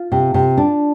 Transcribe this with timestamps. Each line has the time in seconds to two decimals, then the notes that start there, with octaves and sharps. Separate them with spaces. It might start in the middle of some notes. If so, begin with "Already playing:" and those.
Already playing: F4 F5
0.12 C3
0.34 C3
0.57 D4